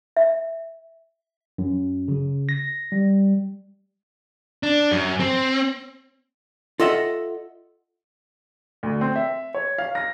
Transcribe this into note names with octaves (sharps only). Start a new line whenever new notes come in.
E5
F#2
C#3
A#6
G3
D4
F#2
C4
F4 A4 D#5 E5 F#5
D2
C4
E5
C#5
F5
A#6